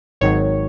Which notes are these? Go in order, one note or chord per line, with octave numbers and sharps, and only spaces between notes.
G#1 G#2 D#3 F#3 C#5